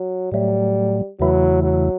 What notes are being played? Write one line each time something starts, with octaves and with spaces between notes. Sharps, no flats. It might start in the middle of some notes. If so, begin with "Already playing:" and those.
Already playing: F#3
A2 F#3 G3 A3
E2 C#3 E3 F#3 A3 E4
F#3